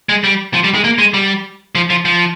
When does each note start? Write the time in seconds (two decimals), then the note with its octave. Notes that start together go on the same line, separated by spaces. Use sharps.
0.09 G#3
0.24 G3
0.54 F3
0.64 G3
0.75 G#3
0.84 A#3
0.99 G#3
1.14 G3
1.75 F3
1.90 F3
2.05 F3